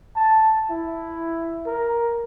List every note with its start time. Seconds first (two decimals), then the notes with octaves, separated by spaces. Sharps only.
0.16 A5
0.70 E4
1.66 A#4